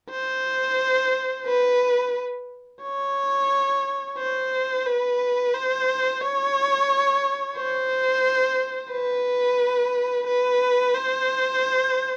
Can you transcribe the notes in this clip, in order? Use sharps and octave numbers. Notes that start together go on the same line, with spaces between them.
C5
B4
C#5
C5
B4
C5
C#5
C5
B4
B4
C5